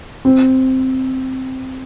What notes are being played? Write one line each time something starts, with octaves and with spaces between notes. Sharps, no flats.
C4